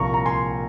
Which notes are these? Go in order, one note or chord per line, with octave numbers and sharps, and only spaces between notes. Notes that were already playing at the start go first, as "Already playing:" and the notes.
Already playing: C2 A#2 F3 A#3 A#5 C#6
A#5
G#5 C6